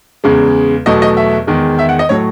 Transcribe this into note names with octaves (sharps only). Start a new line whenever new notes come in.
E2 C#3 G#3
E2 B2 F#3 A3 D#5
D#5
E5
E2 D#3 G#3
E5
F#5
D#5
A2 F#3 A3 C#5